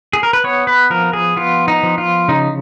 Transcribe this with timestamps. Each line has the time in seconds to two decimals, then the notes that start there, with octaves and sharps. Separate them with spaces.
0.13 G#4
0.23 A#4
0.33 B4
0.44 B3 C#5
0.67 B4
0.90 F3 A#4
1.13 G#4
1.36 B3 F4
1.68 D#4
1.83 F3
1.98 F4
2.28 C#3 D#4